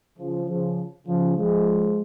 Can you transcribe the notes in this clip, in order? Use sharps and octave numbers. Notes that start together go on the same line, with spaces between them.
C#3 F3
C#3 F3
C#3 F3
F3 G#3